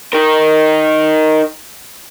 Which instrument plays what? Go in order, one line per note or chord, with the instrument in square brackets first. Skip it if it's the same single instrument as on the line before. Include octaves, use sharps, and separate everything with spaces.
[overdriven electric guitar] D#4 A#4